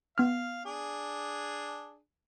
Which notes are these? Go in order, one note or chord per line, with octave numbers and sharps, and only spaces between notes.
B3 F5 F6
D4 G#4